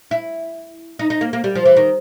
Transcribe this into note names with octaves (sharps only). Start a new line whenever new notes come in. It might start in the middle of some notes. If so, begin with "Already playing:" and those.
E4
D#4
D#4
A#3
A#3
G3
F3
E3
D#3